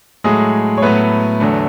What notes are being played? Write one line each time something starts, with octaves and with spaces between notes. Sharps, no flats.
A2 F#3 G#3 A3 G#4
C#5
A2 F#3 A3 B3 B4
E2 D3 F#3 A3